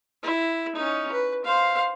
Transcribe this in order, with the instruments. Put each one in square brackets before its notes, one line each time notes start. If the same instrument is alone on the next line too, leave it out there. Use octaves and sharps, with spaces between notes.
[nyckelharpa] E4
C#4 D#4
B4
C5 F5